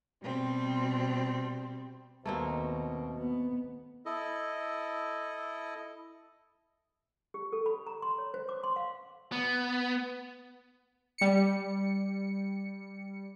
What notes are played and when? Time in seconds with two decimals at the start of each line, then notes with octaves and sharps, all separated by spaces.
0.21 B2 G3 C4
2.25 D#2 B2 A3 A#3 C4
3.19 B3
4.06 E4 A4 D#5
7.34 G4
7.53 A4
7.66 B5
7.87 A#5
8.02 C6
8.18 C#5
8.34 C5
8.49 D6
8.64 C6
8.76 F5
9.32 B3
11.18 G3 C#7